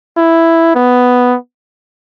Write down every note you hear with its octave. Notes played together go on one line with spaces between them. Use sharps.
E4
B3